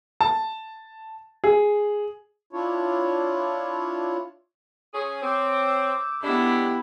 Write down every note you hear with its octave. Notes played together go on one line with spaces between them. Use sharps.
A5
G#4
D4 E4 F4 C#5
C#4 G#4 C#5
C4 D6 E6 G6
G#3 A3 B3 D4 E4 G4